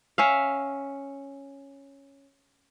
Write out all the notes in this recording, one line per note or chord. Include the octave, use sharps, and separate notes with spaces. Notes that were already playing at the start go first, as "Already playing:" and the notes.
C#4 E5 F5